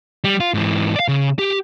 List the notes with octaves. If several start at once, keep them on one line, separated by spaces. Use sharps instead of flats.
G3
F4
G#2 E3
D5 F5
C#3
G4